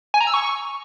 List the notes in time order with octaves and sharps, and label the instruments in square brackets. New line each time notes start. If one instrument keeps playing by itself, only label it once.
[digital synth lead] G#5
A#5
E6
C#6